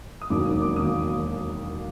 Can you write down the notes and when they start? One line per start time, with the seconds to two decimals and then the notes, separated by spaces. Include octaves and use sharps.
0.22 D#6
0.30 E1 D#2 D#3 F#3 A#3 D6
0.46 D#6
0.62 D6
0.76 D#3 F#3 A#3 D#6